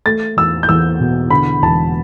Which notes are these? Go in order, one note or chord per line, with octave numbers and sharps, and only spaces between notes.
A3 A6
E2 E6
G6
E2 E6
B2
D3 B5
E1 A5